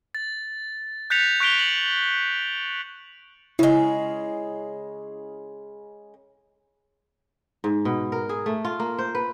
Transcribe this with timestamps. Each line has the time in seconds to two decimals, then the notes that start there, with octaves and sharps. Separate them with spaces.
0.15 A6
1.10 F#6 G6 A6 B6 C#7 F7
1.40 C#6 F#6 B6 D7 F7 G7
1.59 F#7
3.59 C#3 G#3 E4
7.64 G#2
7.85 B2
8.12 A#4
8.29 G#4
8.46 A3
8.65 F4
8.80 A#3
8.99 C5
9.15 B4